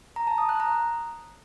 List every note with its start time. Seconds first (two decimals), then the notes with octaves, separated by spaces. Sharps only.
0.16 A#5
0.27 A5
0.38 D#6
0.49 F#6
0.60 A#5